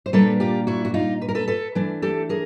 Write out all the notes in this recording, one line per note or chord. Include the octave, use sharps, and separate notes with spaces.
C5
A#2 G3 A#3 D4 A4 B4
F4 G4
E4 F#4
F#4
D#4 F4
B4
A#4
A4 B4
A4 B4
E3 A3 D4
G4 A4
G#4 A#4